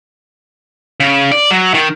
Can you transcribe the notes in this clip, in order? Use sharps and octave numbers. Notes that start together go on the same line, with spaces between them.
C#3
D5
F#3
D#3